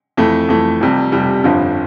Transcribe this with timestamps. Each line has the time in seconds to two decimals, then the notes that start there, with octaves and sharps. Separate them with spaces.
0.17 F2 E3 A3
0.48 F2 E3 A3
0.81 F1 F2 C3 G3
1.12 F1 F2 C3 G3
1.44 G1 F2 D3 F3